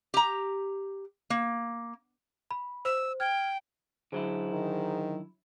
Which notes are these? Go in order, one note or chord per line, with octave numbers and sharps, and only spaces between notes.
G4 A#5
A#3
B5
C5 E6
G5 F6 G#6
G#2 D3 F#3 E4
D#3